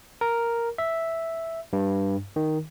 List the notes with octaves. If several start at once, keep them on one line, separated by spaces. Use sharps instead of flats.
A#4
E5
G2
D#3